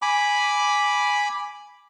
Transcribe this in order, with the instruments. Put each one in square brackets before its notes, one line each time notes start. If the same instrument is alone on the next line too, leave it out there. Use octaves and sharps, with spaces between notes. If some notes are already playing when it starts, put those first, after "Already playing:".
[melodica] G#5 B5 D6